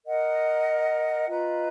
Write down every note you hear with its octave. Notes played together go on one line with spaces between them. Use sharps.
A#4 D#5 F#5
F4 B4 D#5 A#5